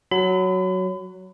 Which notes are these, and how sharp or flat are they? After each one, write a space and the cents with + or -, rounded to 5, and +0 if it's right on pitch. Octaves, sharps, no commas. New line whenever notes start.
F#3 +5 B5 +35